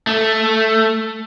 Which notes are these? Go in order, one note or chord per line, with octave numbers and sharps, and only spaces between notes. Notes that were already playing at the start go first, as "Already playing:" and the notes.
A3